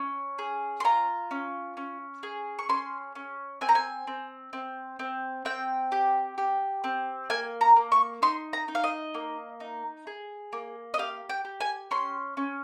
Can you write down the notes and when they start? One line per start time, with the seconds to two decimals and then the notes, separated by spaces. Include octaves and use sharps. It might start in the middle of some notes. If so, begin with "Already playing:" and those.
Already playing: C#4
0.39 G#4
0.80 C6
0.85 F4 A#5
1.31 C#4
1.77 C#4
2.23 G#4
2.59 C#6
2.69 C#4 C6
3.15 C#4
3.61 C4 G#5
3.69 A#5
3.75 G#5
4.07 C4
4.53 C4
4.99 C4
5.45 C4 G5
5.92 G4
6.38 G4
6.84 C4
7.30 A#3 G#5
7.61 A#5
7.76 A#3
7.92 C#6
8.22 D#4 C6
8.53 A#5
8.68 D#4
8.75 F5
8.84 D#5
9.14 A#3
9.60 D#4
10.07 G#4
10.53 A#3
10.94 D#5
10.99 G4 F5
11.29 G5
11.45 G4
11.61 G#5
11.91 C#4 C6
12.37 C#4